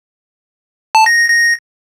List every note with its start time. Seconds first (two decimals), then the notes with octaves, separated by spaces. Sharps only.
0.95 A5
1.06 A#6
1.18 A#6
1.29 A#6